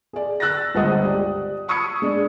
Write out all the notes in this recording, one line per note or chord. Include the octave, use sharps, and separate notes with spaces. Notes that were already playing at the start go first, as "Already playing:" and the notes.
G#4 D5
E6 F#6 A6 A#6
G1 C#2 C5 D#5 F#5 D#6
G4 D5
B5 C#6 D#6 E6 G#6 C#7
G#3 D4